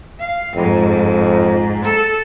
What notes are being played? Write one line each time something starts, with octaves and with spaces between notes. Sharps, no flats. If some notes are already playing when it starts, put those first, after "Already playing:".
F5
F2 G#2
A4